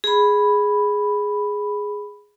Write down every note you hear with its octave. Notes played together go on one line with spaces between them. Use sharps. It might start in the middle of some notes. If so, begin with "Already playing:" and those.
G#4 B5